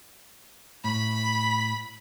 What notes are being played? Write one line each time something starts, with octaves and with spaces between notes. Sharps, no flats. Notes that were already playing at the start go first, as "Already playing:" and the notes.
A2 B5